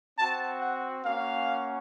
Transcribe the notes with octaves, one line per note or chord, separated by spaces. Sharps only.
C4 F#4 A5
F#5
A#3 C#4 F#4 F5